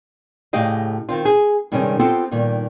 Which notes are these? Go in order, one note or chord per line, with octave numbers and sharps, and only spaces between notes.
A2 C#3 G4 D#5 F5
D#3 C4 F4
G#4
G2 C3 D#3 G3 G#3 C#4
B3 C4 F4 G4 A4 C5
G2 A#2 D#3